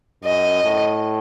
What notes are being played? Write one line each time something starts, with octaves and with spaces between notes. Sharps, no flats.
F#2 D#5
A2